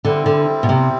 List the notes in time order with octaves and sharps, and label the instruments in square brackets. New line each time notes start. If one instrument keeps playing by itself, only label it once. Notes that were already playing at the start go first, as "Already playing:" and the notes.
[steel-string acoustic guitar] D3 [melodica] G3 C4 E4
[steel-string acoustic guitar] D3
B2
C3